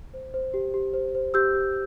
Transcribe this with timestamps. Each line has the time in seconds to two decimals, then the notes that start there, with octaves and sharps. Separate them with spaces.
0.14 C5
0.34 C5
0.54 G4
0.74 G4
0.94 C5
1.15 C5
1.34 G4 E6 G6
1.54 G4